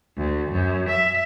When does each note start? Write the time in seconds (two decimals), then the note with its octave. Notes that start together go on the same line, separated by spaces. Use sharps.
0.16 D2
0.50 F#2
0.90 E5